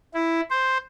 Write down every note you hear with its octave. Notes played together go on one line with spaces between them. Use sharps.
E4
C5